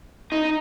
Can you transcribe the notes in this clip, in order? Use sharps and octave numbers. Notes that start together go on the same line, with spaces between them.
D#4